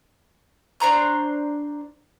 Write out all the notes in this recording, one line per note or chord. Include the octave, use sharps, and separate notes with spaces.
D4 C5 A#5 C#6